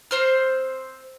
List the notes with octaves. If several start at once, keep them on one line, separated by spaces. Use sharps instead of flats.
C4 C5 F6